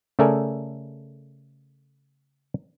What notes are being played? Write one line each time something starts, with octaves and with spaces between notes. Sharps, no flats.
C#3 A3 A4 A#4 D5 G#5